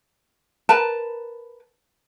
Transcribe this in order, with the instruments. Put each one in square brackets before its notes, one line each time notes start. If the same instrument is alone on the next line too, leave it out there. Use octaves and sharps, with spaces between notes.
[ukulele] A#4 B4 A5